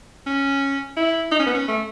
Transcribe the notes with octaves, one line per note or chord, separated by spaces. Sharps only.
C#4
E4
D#4
C#4
B3
C#4
A3